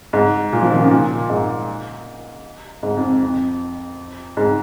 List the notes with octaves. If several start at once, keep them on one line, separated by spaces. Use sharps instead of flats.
G#2
A#2
F3
D#3
C#3
A#2
G#2
G#2
F2
F2
G#2